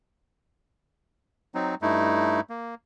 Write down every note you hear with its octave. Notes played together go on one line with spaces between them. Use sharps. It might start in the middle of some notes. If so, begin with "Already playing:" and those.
F#3 C4 D#4
G2 A3 D#4 E4
A#3